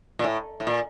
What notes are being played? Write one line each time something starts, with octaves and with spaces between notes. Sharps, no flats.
A#2
A2
A2
A#2